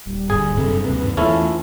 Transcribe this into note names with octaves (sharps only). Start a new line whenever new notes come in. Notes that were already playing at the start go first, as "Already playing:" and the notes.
D#1 G3
G1 G#4
F#1 G2 C3 A4
D#2 C3 B4
E2 E3 A3 C#4 E4 F4 A4